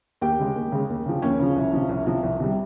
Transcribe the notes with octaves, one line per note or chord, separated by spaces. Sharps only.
D#2 G4 G5
C#3 G#3
D#2
C#3 G#3
D#2
C#3 F3
D#2 C#4 C#5
C#3 F3
C2
C3 F3
C2
C3 F3
C2
C3 G3